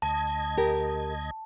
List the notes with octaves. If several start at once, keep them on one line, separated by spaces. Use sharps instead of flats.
D2 D#5 A5 G#6
G4 A#4